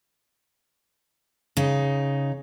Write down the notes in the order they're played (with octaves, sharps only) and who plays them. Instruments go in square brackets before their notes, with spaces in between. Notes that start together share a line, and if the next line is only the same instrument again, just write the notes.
[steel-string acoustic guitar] C#3 D#4